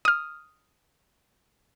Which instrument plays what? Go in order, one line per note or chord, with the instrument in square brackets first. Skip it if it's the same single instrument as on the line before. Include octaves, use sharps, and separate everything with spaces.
[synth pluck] D#6 F6